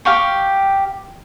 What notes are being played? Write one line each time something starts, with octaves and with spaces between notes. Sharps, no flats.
G4 F5 G5 C#6